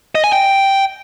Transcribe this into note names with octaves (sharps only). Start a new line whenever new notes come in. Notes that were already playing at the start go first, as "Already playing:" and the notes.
D#5
G#5
G5